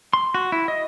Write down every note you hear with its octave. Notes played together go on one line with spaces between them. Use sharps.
C6
F#4
E4
D#5